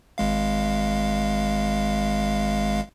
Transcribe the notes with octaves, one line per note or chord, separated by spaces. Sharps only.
G#1 G#3 F5